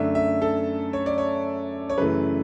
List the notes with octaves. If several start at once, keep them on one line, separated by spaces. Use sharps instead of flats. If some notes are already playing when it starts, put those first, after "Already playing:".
Already playing: F#2 D3 A3 D4 E5
E5
A4
C#5
D5
C#5
C#5
F#2 C#3 E3 A3 B4